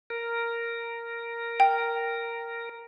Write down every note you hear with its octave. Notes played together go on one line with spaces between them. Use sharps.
A#4
G5